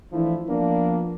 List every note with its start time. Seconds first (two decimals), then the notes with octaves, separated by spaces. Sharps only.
0.12 E3 F3 A3 D4 E4
0.48 F3 A#3 B3 D4